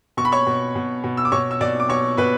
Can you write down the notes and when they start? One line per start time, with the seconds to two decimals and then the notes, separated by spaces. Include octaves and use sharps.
0.17 B2 C#6
0.25 B5
0.32 C#5 C#6
0.47 B2
0.75 B2
1.04 B2
1.17 E6
1.25 D6
1.32 B2 C#5 C#6
1.51 E6
1.61 B2 D5 D6
1.80 D6
1.89 B2 C#5 C#6
2.17 B2 B4 B5